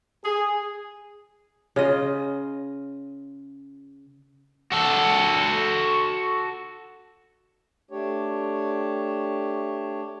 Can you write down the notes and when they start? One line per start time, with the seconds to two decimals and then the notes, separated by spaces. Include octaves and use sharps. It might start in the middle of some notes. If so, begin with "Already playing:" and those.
0.24 G#4
1.76 C#3 F4 D#5
4.72 F#4 A4
7.91 A3 D4 G4 C#5